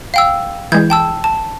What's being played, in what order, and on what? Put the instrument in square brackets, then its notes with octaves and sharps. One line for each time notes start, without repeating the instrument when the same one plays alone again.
[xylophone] F5 G5 E6
[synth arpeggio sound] E3 G#3 [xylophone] G6 G#6
[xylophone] G5 A5 E6
A5